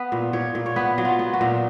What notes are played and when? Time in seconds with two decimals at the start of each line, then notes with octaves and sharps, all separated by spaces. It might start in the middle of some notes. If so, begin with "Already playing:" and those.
Already playing: B3 B4
0.12 A#2
0.33 A#2 C#5
0.55 A#2
0.66 C#5
0.76 B3 B4
0.98 F#3
1.05 F4
1.19 B3
1.34 F#4
1.41 A#2